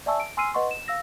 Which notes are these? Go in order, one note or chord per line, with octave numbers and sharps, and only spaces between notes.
D5 E5 G#5 A5 C#6 E6
D7
G#5 C6 E6 F6 C7 D#7
B4 D#5 F#5 C6 C#6
E7
F5 E6 A#6